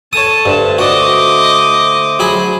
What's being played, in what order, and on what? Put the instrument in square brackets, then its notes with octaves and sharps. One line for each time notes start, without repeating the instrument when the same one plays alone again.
[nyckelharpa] A4 A5 [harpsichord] C#5 D#6
[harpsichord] G2 [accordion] D3 A3 C5
[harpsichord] F#4 [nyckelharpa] D#5 D6
[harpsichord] F#3 G#4 B5